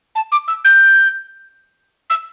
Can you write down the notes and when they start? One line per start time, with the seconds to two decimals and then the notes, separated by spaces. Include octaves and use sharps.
0.15 A5
0.32 D6
0.48 E6
0.65 G6
2.10 E6